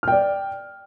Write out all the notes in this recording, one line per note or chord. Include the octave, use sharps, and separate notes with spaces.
D5 G5 F6